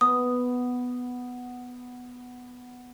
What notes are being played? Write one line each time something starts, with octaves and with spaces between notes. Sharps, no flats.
B3 D#6